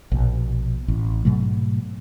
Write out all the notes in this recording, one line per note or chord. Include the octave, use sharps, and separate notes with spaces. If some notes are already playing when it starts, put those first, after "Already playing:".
A#1 B2
A1
G#2 B2 F#3 A3